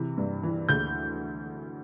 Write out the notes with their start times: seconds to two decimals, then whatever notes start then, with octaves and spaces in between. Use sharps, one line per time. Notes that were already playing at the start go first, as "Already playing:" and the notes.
Already playing: C3 E3
0.17 G2
0.43 E3
0.69 D2 G6